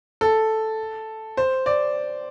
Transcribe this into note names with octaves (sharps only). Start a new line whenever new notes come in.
A4
C5
D5